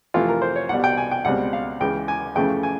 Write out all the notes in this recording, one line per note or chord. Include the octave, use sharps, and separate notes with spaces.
F2 C3 E3 A3 F4
A#4
C5
C#5
C2 B2 G3 F#5
G5
G#5
G5
C#2 B2 G3 C4 F#5
F5
C#2 C#3 E3 G5
G#5
F2 C#3 E3 A3 C#4 G5
G#5